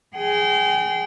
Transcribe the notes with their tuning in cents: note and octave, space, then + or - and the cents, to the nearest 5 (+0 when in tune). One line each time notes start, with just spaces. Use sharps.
G#4 +0 G5 -35